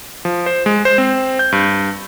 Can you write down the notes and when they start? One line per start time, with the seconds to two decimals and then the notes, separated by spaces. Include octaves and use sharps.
0.25 F3
0.46 C5
0.66 G#3
0.85 C5
0.98 C4
1.39 G6
1.52 G2